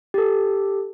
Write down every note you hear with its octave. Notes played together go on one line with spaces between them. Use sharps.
G4 A4